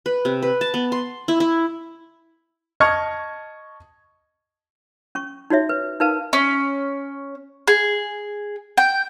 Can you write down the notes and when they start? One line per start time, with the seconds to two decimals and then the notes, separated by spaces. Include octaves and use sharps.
0.06 B4
0.25 C3
0.42 B4
0.61 A5
0.74 B3
0.92 C6
1.28 E4
1.40 E4
2.80 D#5 A5 C#6 F6 G#6 C#7
5.15 C#4 C#6
5.50 D#4 F#4 C#5 E5
5.69 B4
6.00 D#4 A#4 B4 F5 A5
6.33 C#4
7.68 G#4
8.78 G5